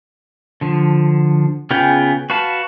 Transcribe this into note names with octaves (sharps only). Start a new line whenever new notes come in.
D3 F3
C#3 B3 F4 G#4 G5
F#4 B4 F5 A5